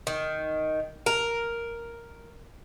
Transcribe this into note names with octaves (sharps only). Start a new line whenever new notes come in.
D#3
A#4